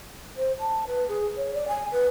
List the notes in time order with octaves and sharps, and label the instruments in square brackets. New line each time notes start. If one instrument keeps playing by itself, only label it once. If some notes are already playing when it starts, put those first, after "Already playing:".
[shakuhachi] C5
A5
B4
G#4
C#5
D5
G#5
B4